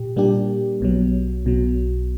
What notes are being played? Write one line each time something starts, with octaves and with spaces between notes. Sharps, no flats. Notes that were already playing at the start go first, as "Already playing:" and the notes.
Already playing: A#2 G4
A#2 G3 A#3 D4 G4
B1 B2 F#3
B1 B2 F#3